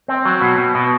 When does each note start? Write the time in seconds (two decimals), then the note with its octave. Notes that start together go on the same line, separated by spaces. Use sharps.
0.08 C4
0.25 F#3
0.41 B2
0.58 B2
0.75 B2